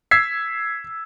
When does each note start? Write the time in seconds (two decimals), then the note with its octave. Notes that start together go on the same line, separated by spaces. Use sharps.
0.11 E6 G#6 B6 C7